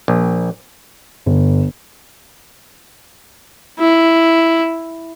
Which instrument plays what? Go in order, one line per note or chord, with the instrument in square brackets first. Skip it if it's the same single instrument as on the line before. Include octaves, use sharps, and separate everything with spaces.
[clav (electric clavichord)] A#1
[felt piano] G1
[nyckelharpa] E4